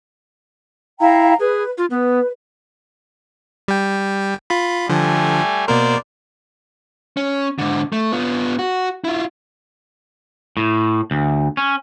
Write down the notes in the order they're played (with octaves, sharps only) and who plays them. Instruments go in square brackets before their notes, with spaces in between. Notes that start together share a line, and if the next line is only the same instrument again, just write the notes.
[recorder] E4 [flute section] F5 G5 A#5
[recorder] G#4 [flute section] B4
[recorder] F4
[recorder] B3 [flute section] B4
[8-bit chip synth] G3 G5
F4 B5
[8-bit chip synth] D3 F3 [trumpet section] G3 A3 G#5
[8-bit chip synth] B2 A#3 A#4 [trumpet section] C5 D5
[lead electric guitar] C#4
G#2 D3
A3
B3 F4
F#4
E4 F4
[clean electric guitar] A2
D2
C#4